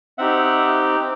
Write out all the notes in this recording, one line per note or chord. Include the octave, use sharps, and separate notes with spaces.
C4 D#4 G4 E5 F#5
C4